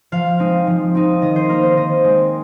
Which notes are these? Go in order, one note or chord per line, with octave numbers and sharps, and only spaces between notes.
F3 F5
G#3 C4 D#4
F3
C4 D#4
D#3 D#5
C5
A#3 D#4 A#4
C5
D#3 D#5
G#3 C4